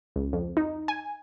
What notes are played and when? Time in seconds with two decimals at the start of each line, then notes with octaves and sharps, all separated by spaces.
0.16 C#2
0.33 F2
0.57 D#4
0.88 G#5